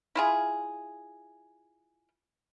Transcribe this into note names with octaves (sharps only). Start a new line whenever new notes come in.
E4 F4 G#4